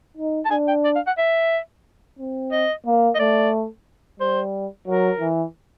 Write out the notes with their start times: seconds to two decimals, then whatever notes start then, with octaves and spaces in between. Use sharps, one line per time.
0.17 D#4
0.45 A5
0.51 D4 G#5
0.68 G5
0.85 D5
0.96 F5
1.07 F#5
1.18 E5
2.19 C4
2.52 D#5
2.86 A#3
3.15 D#5
3.19 A3 D5
4.20 G3 C5
4.87 F#3 A#4
5.20 E3